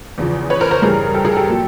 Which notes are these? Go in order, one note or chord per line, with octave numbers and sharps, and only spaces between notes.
E2 C#3 F3
B4 C#5
A#4 C5
A#4 C5
G2 E3 G3 G#4 A#4
G4 A4
G#4 A#4
G4 A4
A#2 F#3